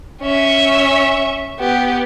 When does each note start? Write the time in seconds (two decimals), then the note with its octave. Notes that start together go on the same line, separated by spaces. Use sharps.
0.22 C#4 E5
1.59 B3 G4